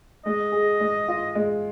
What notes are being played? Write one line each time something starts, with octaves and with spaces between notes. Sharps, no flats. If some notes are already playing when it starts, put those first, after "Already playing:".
G#3 D#5
G#4
G#3
F4
G#3